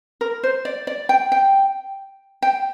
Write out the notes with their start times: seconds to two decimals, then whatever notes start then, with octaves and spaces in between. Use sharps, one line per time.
0.21 A#4
0.43 C5
0.65 D5
0.87 D5
1.09 G5
1.32 G5
2.42 G5